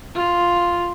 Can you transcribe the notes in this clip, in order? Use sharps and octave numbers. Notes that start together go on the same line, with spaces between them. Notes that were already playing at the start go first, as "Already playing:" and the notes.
F4